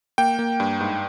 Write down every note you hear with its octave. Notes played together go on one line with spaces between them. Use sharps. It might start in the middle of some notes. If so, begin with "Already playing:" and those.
A#3 G5
A#3
G2
G#2